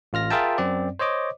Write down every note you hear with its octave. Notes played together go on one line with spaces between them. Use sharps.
A1 F4 F6 A#6
F4 G#4 A#4 E5 G5 A5
F#2 C4 D5
C5 C#5 D#5 D6